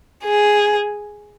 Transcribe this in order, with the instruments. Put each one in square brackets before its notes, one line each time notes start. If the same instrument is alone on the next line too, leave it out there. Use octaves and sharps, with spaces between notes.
[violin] G#4